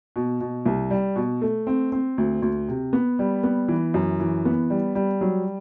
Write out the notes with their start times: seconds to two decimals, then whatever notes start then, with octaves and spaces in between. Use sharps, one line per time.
0.16 B2
0.41 B2
0.66 C2
0.91 G3
1.16 B2
1.42 A3
1.67 C4
1.92 C4
2.18 D2
2.42 D2
2.69 C3
2.93 B3
3.19 G3
3.43 B3
3.68 E3
3.94 F#2
4.20 E3
4.45 B3
4.70 G3
4.95 G3
5.21 F#3